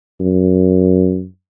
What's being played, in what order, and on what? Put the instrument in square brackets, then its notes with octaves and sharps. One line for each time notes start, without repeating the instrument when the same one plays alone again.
[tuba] F#2